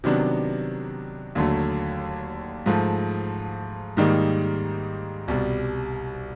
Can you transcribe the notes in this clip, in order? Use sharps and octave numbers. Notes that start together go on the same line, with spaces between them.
C3 D#3 F#3 B3 D4
D#2 D3 F#3 A3
G#2 F3 A3
G#2 D#3 G3 A#3 D#4
C2 B2 G3